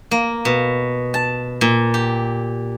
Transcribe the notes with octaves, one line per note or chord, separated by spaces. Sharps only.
A#3
B2
A5
A#2
G4